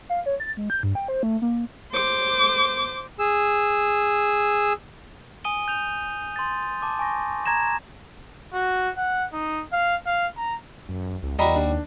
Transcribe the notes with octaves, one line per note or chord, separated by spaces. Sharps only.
F5
C#5
A6
G#3
G6
G2
G5
C5
A3
A#3
C5 D6
G#4 E6
G#5 D#6 D#7 G7
G6 F7
C6 A6
A5 D6
G#5 C#6 A#6
A#5 G#6 A#6 E7
F#4
F#5
D#4
F5
F5
A#5
F#2
C#2
E2 G3 F#4 D#5 A#5 B5
D#2 D4